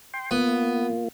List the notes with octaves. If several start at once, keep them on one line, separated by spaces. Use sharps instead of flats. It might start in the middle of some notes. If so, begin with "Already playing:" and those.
G5 C6
A#3 B3 F4